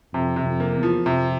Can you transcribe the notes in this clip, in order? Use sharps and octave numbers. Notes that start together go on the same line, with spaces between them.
F2 C3
C3
F2
A#3
E2
F3
F2 C3